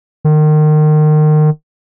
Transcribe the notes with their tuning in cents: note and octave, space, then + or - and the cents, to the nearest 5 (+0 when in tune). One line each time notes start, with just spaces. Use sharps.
D#3 -30